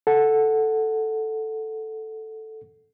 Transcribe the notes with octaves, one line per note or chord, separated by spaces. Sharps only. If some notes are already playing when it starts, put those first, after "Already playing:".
A4 F#5